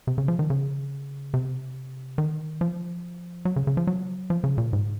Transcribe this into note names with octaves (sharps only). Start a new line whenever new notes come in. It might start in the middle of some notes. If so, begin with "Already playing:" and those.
C3
C#3
F3
D#3
C#3
C3
D#3
F3
F#3
C#3
C#3
F3
F#3
F3
C#3
A#2
G#2